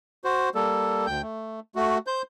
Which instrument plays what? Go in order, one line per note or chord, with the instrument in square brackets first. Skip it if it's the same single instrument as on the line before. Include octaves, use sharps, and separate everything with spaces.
[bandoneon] F#4 C5
G3 A#3 A4
D2 G5 G6
A3
A3 F#4
C5 G6